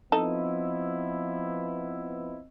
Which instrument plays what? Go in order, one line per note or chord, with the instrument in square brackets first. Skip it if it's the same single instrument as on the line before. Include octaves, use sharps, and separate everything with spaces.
[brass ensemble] F3 B3 E4 [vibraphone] C4 D#5 E6 [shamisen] D#4 A4